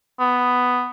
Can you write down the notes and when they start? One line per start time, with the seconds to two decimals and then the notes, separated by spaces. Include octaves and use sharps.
0.20 B3